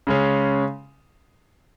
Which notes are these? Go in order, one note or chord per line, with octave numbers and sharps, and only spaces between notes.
C#3 G#3 C#4